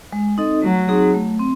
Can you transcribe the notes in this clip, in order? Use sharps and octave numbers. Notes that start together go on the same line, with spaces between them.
G#3
C4 D#4 A4 D#5
F#3 A3
C4 D#4 G#4
A3
C4